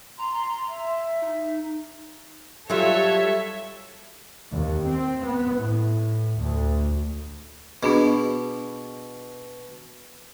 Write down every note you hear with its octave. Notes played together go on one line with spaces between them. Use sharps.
A#5 C6
E5
D#4
F#3 G3 F4 A4 C#5 E5
D#2
C4
B3
A2
D2
B2 B3 D4 G#4